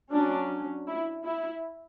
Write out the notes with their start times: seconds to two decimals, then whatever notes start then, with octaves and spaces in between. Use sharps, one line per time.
0.12 F#3 C#4 D4
0.87 E4
1.24 E4